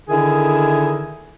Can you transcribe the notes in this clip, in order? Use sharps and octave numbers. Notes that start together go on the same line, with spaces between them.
D3 D#3 E4 G#4 A#4